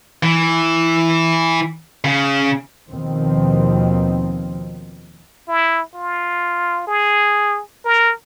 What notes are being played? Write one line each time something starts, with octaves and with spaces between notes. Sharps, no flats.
E3
C#3
D#2 B2 D#3 F3 C4
E4
F4
G#4
A#4